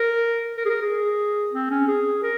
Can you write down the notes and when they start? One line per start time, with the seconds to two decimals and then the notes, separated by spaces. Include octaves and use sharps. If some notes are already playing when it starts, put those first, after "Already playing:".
Already playing: A#4
0.57 A#4
0.65 G#4
0.69 A#4
0.81 G#4
1.52 C4
1.70 C#4
1.87 G#4
2.23 A#4